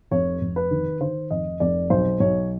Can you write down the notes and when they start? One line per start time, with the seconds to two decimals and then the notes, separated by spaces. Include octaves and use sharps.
0.11 F1 C#5
0.41 F1
0.56 B4
0.71 D#3
1.01 D#3 C5
1.31 F1 D#5
1.60 F1 D5
1.90 B1 C5
2.20 B1 C#5